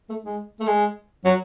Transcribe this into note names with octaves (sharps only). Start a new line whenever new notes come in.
A3
G#3
A3
G#3
F#3